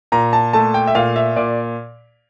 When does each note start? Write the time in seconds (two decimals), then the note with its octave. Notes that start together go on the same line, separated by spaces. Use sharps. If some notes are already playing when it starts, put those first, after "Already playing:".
0.12 A#2 A#5
0.33 A5
0.53 A3 A5
0.74 G5
0.87 E5
0.95 A#2 F5
1.16 E5
1.36 A#2 D5